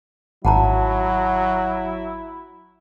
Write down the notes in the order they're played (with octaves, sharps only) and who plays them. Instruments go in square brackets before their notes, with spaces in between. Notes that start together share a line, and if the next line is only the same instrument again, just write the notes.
[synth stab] G#1 [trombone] F#3 [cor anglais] E4 [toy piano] F#5 A5 A#5